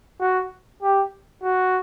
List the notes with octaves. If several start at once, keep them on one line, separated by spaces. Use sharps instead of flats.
F#4
G4
F#4